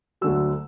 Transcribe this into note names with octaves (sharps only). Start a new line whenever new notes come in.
D2 D3 F#3 E6